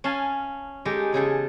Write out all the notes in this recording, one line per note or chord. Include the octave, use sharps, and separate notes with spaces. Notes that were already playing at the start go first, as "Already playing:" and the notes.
C#4 F5 G#5 A5
G#3 D#4 G4 A4
E2 C#3 G#4 A4